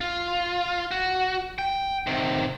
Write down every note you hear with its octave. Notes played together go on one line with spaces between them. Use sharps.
F4
F#4
G5
C3 D#3